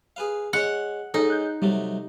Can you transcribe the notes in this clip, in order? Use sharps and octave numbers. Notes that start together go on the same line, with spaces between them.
G#4 B4 F5
G#3 C#5 F#5
G#2 C#4 D#4 A4
F#6 G6
C3 F#3 G3 A3